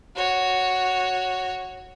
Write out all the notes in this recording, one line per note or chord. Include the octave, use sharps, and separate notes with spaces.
F#4 C#5